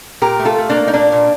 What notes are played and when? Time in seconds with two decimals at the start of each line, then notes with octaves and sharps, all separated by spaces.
0.22 A#2 G4 A#4
0.40 A3
0.45 F4 A4
0.58 A3
0.69 A#3 D4
0.76 A3
0.87 D#4
0.93 A#2 A#3 D4
1.12 A#2